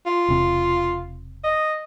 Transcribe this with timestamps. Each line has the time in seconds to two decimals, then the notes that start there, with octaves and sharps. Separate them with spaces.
0.06 F4
0.28 E1 C3
1.44 D#5